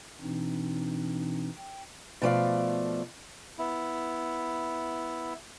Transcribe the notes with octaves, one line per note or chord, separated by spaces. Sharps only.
B2 E3 C4 D4 D#4
G5
B2 F3 A3 D5 F5
B3 E4